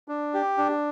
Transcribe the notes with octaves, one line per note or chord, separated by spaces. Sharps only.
D4
G4
D4